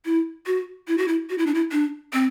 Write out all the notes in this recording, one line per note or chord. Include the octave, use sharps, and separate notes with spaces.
E4
F#4
E4
F#4
E4
F#4
E4
D4
E4
D4
C4